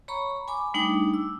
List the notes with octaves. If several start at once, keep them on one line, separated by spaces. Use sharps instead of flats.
C#5 A#5 B5 C#6
G#5 B5 D6
G3 A3 D4 D#4 G5 D6
E6